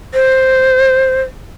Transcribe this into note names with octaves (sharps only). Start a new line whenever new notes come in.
C5